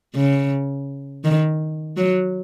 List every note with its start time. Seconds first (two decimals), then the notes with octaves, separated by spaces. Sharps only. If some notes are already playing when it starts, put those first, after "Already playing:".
0.15 C#3
1.25 D#3
1.97 F#3